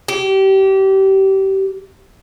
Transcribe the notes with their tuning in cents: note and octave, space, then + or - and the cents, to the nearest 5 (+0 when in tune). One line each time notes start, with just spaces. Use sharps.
G4 -25